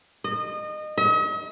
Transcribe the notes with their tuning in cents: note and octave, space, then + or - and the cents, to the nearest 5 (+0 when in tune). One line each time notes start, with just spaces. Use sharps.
D#5 -25
D#5 +45